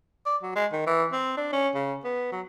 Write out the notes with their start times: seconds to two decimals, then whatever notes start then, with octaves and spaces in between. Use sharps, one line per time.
0.26 D5
0.43 F#3
0.55 G#3
0.72 D#3
0.86 E3
1.12 C4
1.37 D4
1.53 C#4
1.75 C#3
2.04 B3
2.32 F#3